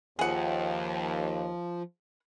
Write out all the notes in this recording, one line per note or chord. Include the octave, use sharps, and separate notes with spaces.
D#2 F3 G#4 F#5